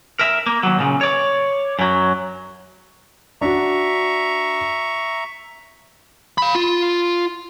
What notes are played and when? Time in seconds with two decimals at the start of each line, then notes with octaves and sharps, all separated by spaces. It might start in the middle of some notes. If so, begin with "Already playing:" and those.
0.19 A#4 E5
0.46 A#3
0.63 D#2 F#3
0.79 A#2 C#3
1.01 C#5 D5
1.79 F#2 F#3
3.41 D4 F#4 E5 A#5 C#6
6.38 F5 B5
6.55 F4